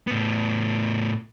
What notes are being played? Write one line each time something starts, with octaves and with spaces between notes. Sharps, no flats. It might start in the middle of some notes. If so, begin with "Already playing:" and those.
A2 B3